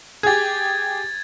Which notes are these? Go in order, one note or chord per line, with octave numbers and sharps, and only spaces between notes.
G4 G#4 G#6 A6